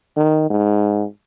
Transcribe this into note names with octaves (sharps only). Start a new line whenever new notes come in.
D#3
G#2